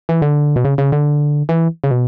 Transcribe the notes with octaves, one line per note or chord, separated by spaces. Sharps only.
E3
D3
B2
C#3
C#3
D3
E3
C#3
B2